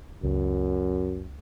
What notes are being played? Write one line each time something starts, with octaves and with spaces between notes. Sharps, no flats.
C#2 F#2